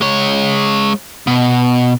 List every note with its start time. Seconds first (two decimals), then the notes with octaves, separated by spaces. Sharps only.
0.01 G#3 C#5
1.27 B2